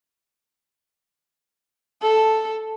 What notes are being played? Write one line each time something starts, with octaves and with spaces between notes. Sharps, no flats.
A4